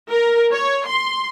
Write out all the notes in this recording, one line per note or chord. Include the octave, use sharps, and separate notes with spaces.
A#4
C#5
C6